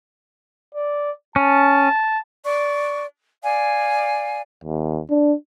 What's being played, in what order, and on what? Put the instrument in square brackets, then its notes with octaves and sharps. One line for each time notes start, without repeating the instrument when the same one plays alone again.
[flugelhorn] D5
[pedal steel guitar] C#4 [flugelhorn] A5
[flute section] D5 C#6
D5 F5 G#5
[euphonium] D#2
D4